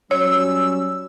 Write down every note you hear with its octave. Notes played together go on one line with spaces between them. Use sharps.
F#3 G3 C#4 C#5 E6